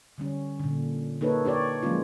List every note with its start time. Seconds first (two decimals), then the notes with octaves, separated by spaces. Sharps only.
0.18 D3 G3 C#4
0.60 A#2 D3
1.21 A#3 D#4 A4 B4 C#5
1.45 D4 G4 C#5 D5
1.83 F3 F#3 G#3 A#3 C#4 F4